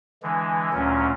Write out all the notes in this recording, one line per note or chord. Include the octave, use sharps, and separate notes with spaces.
D3 E3 G#3
D2 A#2 F#3 C#4